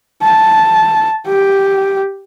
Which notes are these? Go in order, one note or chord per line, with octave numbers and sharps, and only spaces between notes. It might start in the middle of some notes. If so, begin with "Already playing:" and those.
A5
G4